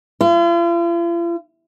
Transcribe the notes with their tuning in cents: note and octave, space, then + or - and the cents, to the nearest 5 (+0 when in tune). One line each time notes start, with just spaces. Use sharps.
F4 -45